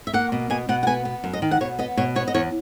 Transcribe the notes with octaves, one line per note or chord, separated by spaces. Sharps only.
E5
A#3 F#5
B2
B2 G#5
B2 F#5
F#5
B3 G#5
B3
F#2
D#5
D#3
F#5
B2 C#5
B3 D#5
B2 C#5
B3 C#5
D#5
E2 C#5